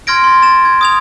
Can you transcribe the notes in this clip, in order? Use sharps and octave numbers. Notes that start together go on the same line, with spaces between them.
C6 F6 G#6 A#6 D7
C6 A6
A6 E7
G#6
D#6 G#6 F7